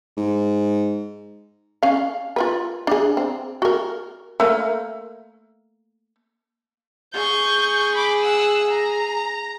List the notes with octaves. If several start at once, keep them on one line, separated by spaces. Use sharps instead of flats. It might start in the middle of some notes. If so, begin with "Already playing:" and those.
G#2
C#4 F5
F4 A#4 B4
D4 G#4
C4
F#4 A#4
A3 A#3
G#4 C#6 G6
B5 D6
F#5 E6
A#5